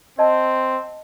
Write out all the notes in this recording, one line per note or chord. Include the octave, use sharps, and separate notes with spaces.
C4 D#5 A5